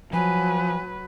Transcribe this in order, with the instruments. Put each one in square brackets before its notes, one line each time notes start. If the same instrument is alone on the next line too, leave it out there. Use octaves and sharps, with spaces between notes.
[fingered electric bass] F3 [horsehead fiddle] F#3 B4 [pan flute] G#5